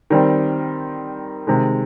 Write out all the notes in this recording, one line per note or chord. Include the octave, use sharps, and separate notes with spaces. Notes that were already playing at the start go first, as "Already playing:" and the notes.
D#3 G3 C4
C3 D#3 G#3